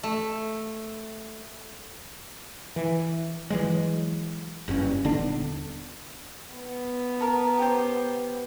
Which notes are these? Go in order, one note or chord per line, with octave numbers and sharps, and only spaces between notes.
A3
E3
E3 F#3 G#3
F#1 G2 C3 C#4
D#1 D3 B3 D4
B3
A#4 A5
G4 C5